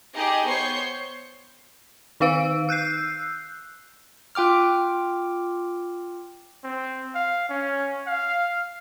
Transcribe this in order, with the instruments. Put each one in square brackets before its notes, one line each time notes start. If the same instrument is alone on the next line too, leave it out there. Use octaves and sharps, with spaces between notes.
[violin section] D#4 G4 G#4 D#5 G5
B3 C5 C#5 C#6 G6 C7
[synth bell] D#3 D#4 B4 F5 E6 D7
E6 F#6 G6 C7
[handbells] F4 G5 D6 F6
[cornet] C4
F5
C#4
F5